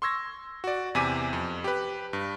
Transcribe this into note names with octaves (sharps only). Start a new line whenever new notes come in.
C6 C#6 E6 G#6 A#6
F#4 D5
E2 C3 G#5 D6 B6 D#7
F2
G4 B4
G2